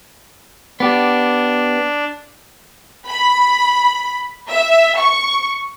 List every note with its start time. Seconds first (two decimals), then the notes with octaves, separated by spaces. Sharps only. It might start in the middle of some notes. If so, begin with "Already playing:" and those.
0.80 B3 D4 G4
3.08 B5
4.52 E5
4.98 C#6